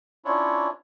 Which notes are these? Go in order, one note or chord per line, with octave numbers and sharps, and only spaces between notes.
C#4 D4 E4 F4 C#5